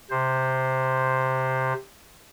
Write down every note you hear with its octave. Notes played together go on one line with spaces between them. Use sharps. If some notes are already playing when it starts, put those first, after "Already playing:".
C3 C5